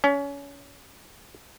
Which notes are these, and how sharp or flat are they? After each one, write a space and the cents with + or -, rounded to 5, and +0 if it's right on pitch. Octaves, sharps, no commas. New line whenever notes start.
C#4 +25